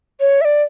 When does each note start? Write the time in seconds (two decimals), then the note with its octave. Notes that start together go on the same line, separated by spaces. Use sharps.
0.20 C#5
0.41 E5
0.45 D5